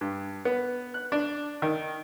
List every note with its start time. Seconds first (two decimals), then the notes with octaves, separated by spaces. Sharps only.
0.01 G2
0.45 B3
0.94 F#6
1.12 D4
1.62 D#3